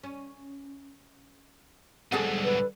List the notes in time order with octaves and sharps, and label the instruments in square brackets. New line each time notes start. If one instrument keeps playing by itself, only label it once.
[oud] C#4
[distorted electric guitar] B1 G#2 [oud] D3 G3 [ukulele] G#4 A4 F#5
[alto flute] B4